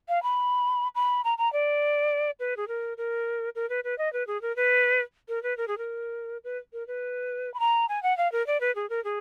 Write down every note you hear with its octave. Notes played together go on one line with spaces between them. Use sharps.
F5
B5
B5
A#5
A#5
D5
B4
G#4
A#4
A#4
A#4
B4
B4
D#5
B4
G#4
A#4
B4
A#4
B4
A#4
G#4
A#4
B4
A#4
B4
B5
A#5
G#5
F#5
F5
A#4
D5
B4
G#4
A#4
G#4